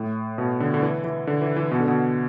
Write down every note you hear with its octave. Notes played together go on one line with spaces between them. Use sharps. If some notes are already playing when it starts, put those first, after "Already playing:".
Already playing: A2
B2
D3
D3
E3
E3
D3
E3
E3
B2
D3
B2